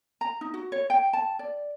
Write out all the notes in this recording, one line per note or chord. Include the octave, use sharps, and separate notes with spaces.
A#5
D#4
F#4
C#5
G5
A5
D5